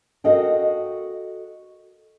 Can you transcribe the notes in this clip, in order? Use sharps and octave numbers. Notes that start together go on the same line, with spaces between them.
F#4 A4 A#4 D#5 F5 G5